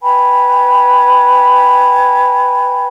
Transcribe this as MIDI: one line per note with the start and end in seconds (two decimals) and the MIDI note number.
0.01 2.88 71
0.01 2.88 79
0.01 2.88 80
0.01 2.88 83